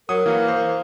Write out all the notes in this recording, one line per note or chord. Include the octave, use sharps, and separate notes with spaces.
F#3 A#4 D#6
E3 A#3
C5